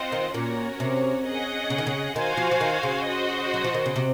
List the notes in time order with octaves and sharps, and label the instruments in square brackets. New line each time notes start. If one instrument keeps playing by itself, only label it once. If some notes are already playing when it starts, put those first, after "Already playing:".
Already playing: [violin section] C4 F4 C5 D#5 F#5
[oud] D#3
[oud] A#2 [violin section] C#4 F#4 A#4 C#5
[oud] C3
[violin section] C#4 G#4 D#5 F#5
[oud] C#3
D#3
C#3
[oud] D#3 [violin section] F#4 C5 F5 G#5
[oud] F3
F3
D#3
C#3
[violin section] F#4 C5 D#5
[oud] F#3
F3
D#3
C#3
C3